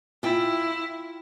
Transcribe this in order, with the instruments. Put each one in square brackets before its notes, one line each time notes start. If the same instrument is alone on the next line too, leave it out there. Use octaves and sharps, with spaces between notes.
[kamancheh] E4 [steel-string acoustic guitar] F4 G5